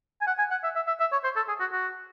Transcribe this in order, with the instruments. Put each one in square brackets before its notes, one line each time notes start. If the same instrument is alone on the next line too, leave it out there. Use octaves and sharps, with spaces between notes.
[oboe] G#5
F#5
G#5
F#5
E5
E5
E5
E5
C#5
C5
A4
G#4
F#4
F#4